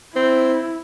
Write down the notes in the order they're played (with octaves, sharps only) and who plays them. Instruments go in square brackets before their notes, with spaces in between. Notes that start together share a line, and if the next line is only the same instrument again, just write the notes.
[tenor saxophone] C4 [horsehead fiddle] E4